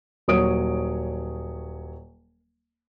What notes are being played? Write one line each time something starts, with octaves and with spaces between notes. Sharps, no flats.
D#1 F#3 C#5 D#6 D7